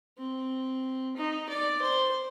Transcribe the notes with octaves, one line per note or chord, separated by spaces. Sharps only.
C4
D#4
D5
C5